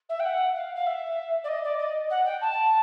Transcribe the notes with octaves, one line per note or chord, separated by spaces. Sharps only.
E5
G5
F#5
F5
F5
E5
D5
D#5
D5
D#5
F#5
G5
A5